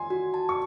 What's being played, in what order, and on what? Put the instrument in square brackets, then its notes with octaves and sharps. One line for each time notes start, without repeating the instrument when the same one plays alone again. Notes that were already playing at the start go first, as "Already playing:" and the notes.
Already playing: [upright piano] G#5 C6
[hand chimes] F#4
A5
[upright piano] C#6